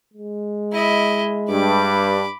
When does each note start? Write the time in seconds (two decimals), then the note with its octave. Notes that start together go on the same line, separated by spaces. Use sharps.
0.13 G#3
0.73 E4 D#5
1.50 G2 B5 D6